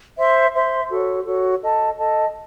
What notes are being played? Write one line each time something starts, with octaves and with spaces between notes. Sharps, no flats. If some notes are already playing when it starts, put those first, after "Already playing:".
C5 E5 C6
C5 E5 C6
F#4 A4 C#5
F#4 A4 C#5
A4 D#5 A5
A4 D#5 A5